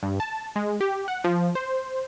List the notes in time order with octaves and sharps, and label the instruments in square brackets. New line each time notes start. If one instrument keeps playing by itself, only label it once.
[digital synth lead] G2
A5
G#3
G4
F#5
F3
C5